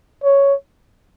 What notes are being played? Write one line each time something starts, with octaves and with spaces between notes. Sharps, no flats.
C#5